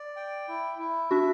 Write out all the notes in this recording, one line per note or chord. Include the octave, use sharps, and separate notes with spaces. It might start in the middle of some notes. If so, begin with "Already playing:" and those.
Already playing: D5
G5
E4
E4
D4 F#4 E5